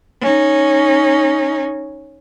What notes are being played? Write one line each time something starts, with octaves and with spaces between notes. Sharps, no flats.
C#4 D#4